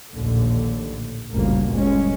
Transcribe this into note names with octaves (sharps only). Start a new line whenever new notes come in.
A#1 D#2 A2 D3
G1 D2 A#2 C#3 A#3
G1 G#3 C#4